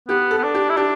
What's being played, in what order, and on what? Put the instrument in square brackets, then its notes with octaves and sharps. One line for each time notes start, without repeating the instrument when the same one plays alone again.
[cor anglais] B3 [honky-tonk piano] G4
[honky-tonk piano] A4
[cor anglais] B3
D4
[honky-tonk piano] G4
[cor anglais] E4
[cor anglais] D4 [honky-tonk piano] G4